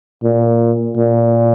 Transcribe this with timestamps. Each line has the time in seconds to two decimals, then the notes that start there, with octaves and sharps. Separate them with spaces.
0.23 A#2
0.97 A#2